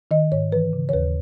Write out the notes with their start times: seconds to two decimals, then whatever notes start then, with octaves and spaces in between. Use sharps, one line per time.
0.11 D#3 D#5
0.32 G#2 C#5
0.52 E3 B4
0.73 C#3
0.89 C#5
0.93 D#2 B4